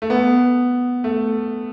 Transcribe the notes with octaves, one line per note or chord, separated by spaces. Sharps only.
A3
B3
A3